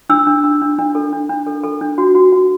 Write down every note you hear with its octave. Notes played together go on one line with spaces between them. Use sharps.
D4 E6
D4
D4
D4
D4
A4
D4
D4
A4
A4
D4
F#4
F#4
F#4